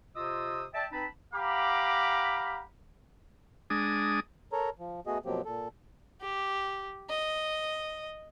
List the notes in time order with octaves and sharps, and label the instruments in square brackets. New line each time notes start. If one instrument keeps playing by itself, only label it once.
[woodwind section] C3 F4 C5 D#5 D#6 E6
D5 E5 G5 A5
C4 D#4 B4 A5 B5
[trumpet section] G4 F5 F#5 A#5 B5 D6
[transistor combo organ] G#3 D4 D#6
[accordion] A4 A#4 C#5 A#5
F3
A3 B3 F#4 G#4 D#5
B2 F3 F#3 A#3 C4 G4
A#2 A4
[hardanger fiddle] G4
D#5